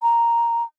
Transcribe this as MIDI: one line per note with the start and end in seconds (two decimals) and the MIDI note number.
0.02 0.63 82